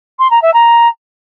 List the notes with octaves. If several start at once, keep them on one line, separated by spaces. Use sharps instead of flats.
C6
A#5
E5
A#5